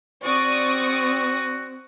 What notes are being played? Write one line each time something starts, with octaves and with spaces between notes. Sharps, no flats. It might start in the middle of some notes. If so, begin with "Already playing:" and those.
C4 F#4 D5 C#6 D#6